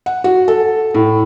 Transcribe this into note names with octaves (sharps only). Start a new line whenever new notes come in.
F#5
F#4
A4
A2